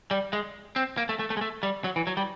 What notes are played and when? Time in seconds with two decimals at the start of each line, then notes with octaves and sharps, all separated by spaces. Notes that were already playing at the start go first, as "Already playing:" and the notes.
0.11 G3
0.33 G#3
0.76 C4
0.97 A#3
1.09 A3
1.19 A3
1.30 A3
1.37 G#3
1.41 A3
1.63 G3
1.84 F#3
1.96 E3
2.07 F#3
2.17 G3